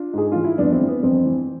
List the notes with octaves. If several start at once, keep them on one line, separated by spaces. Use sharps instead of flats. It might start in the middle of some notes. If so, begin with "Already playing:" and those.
Already playing: D4 F4
G#2 G#4
E3 F4
E4
F2 B3 D4
C4
E3
B3
F2 C4
E3